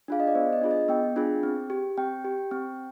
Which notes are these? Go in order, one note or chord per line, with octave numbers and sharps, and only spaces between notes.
D4 F4 G#4 F5
D#5
D5
B3 C5
D#5
D4 F4 G#4
D#5
B3 G5
D4 F4 G#4
C4
G4
C4 G5
G4
C4